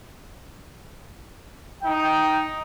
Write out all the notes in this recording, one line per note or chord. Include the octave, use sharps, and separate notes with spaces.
D#4 G5